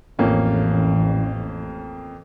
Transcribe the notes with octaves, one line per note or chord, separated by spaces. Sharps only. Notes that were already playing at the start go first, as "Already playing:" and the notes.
A1 F2 A#3 C#4